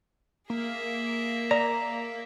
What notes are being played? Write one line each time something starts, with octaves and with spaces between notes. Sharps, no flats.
A#3 G#4 E5
D5 A#5